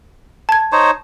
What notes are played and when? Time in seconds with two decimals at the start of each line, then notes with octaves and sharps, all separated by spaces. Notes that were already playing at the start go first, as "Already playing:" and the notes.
0.49 A5 G#6
0.72 D#4 C5 C#5